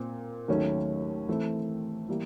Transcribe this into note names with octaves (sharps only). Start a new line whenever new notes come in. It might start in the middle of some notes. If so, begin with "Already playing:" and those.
Already playing: A#2 C4
D#2 D#3 F#3 A3 C#4
E3 A3 C4
E3 G3 A#3